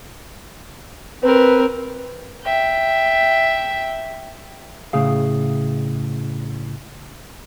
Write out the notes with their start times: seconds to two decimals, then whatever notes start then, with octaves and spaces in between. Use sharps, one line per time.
1.23 C4 A#4 B4
2.44 E5 G5
4.93 A2 C#3 G#4 F5